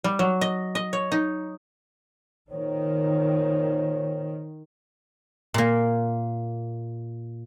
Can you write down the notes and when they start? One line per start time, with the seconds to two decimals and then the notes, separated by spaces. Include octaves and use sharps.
0.04 G3
0.19 F#3
0.41 D#5
0.75 D#5
0.93 C#5
1.12 D#4
2.50 A#2 D#3 C5 C#5
5.54 A#2 A#3